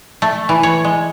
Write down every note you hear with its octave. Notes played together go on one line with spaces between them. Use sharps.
A3
E3
C#5
G#3